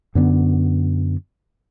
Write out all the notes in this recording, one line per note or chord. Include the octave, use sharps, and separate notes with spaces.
F#2 D3 B3